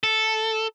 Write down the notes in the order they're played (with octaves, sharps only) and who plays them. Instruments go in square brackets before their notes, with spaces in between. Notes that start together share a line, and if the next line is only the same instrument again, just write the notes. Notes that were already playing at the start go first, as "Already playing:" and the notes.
[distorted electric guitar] A4